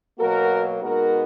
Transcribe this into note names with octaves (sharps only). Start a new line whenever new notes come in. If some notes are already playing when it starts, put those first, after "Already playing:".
B2 F#3 A#3 F#4 A#4
B2 G#3 B3 D#4 F#4 A#4